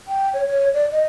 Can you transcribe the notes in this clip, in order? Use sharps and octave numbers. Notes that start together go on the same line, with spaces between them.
G5
C#5
C#5
D5
D#5